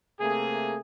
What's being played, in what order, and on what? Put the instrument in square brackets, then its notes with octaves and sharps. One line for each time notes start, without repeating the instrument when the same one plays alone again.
[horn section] C3 A3 A#3 G#4